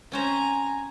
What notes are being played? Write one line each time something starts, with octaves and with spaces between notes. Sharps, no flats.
C4 C#4 C5 G#5 A#5